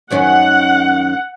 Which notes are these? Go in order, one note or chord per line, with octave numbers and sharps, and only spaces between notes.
F#2 D#3 C#4 F#5